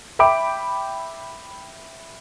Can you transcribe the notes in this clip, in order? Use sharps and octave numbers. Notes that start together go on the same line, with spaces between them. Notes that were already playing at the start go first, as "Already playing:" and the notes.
E5 G5 B5 D6 D7